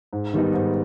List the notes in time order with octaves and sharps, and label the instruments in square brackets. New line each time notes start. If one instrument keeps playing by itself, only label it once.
[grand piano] G#2
D#3 G3 B3 D#4
G#2